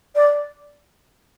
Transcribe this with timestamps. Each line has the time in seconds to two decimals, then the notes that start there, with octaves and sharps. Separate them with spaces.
0.15 D5